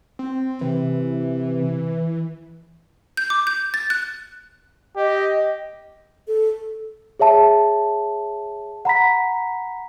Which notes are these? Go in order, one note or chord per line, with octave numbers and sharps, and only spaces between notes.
C4
C3 E3
G6
D6
G6
A6
F#6
G4 D#5
A4
G#4 C#5 E5 A5
F#5 A#5 B5 B6